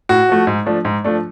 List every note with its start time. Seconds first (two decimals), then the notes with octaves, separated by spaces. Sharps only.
0.09 A2 F#4
0.29 F3 A3
0.47 G#2
0.66 F3 A3 D4
0.85 G#2
1.04 F3 A3 D4